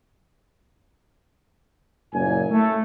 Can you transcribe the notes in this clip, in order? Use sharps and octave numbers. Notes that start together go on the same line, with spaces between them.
F#1 A#2 G#5
A3